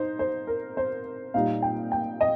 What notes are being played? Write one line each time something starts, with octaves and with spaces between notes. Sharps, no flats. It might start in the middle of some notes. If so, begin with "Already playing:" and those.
Already playing: D#4 C5
C5
A#4
C5
A#2 G3 D#4 F5
G5
G5
D#5